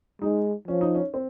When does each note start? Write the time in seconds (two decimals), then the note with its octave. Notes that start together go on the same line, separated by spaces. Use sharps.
0.22 G#3 D#4
0.68 F3 C#4
0.81 D#4
0.95 C#4
1.14 C4